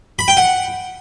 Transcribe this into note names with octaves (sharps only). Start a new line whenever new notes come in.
B5
G5
F#5